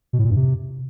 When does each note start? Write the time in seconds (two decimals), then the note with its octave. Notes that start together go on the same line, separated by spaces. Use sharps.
0.13 B2
0.19 A2
0.25 A#2
0.31 G2
0.36 C3